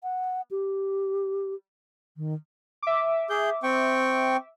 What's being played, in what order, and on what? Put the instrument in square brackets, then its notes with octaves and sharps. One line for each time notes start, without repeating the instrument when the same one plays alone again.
[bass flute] F#5
G4
D#3
[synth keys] E5 D6
[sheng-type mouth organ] G#4 G6
C4 G5 C#6